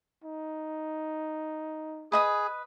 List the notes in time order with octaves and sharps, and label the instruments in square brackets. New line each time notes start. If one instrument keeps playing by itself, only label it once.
[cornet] D#4
[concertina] G#4 [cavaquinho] B4 D#5 D#6